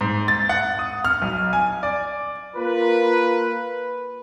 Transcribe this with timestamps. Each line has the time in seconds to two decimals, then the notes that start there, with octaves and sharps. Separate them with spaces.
0.01 G#2
0.28 A6
0.49 F#5
0.79 D#6
1.04 F6
1.22 B1
1.53 G#5
1.83 D5
2.56 A#3 F4 A#4 B4